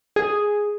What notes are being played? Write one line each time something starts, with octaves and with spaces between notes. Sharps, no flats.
G#4